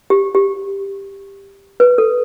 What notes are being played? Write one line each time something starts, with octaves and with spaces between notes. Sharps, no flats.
G4
G4
B4
A4